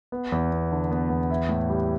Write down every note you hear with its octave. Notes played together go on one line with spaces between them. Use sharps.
B3
E2
B3
D3
B3
E2
E4
A2
G3